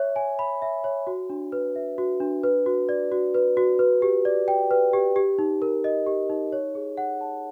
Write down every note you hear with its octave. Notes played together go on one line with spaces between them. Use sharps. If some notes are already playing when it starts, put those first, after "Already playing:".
Already playing: C#5 E5
G#5
B5
E5
C#5
F#4
D4
B4
E5
F#4
D4
B4
F#4
D5
F#4
B4
F#4
B4
G4
D5
G5
B4
G4
G4
D#4
A#4
D#5
G4
D#4
C#5
G#4
F#5
A5